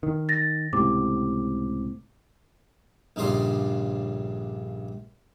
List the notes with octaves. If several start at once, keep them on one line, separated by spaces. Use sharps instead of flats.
D#3
A6 A#6
C#2 A2 C3 D6
A#1 G2 C#3 D4 D#5 C6